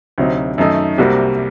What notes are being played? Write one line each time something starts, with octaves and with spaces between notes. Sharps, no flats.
D2 C3 F#3 C4 D#4
F#2 D#3 A3 D#4 A4
C2 C3 G3 A#3 F#4